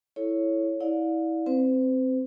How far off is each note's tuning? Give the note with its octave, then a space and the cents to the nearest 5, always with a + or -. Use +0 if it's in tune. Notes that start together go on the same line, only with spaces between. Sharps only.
E4 +0 A4 -5 C#5 +0
E4 -25 D5 +0 F5 +40
C4 +0 C5 -40